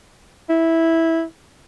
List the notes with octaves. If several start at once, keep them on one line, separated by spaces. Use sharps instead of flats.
E4